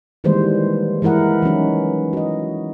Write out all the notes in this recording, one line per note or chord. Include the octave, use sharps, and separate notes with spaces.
D#3 E3 G3 G#3 A#3 C5
E3 G#3 E4 A#4 F#5
E3 F#3 C#4 D#4
F#4 D#5